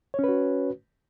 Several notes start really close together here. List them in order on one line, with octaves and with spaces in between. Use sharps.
C#5 C#4 B4 F#4